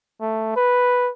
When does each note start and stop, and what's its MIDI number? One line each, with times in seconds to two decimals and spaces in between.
0.21 0.53 57
0.56 1.11 71